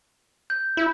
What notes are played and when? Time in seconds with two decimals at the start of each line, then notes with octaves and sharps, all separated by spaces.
0.50 G6
0.77 E4